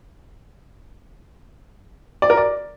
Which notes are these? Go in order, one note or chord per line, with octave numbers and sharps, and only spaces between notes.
D5
A#4
D5